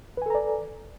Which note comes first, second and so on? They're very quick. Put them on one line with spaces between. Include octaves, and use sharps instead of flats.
B4 G#5 A4 A#5 D5